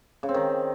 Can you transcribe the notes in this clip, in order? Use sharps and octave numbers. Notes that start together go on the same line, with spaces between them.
C#3
C4
D#3